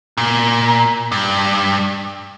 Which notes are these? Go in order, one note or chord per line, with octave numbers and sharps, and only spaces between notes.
A#2
G2